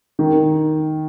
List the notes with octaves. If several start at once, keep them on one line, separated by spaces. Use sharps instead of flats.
D#3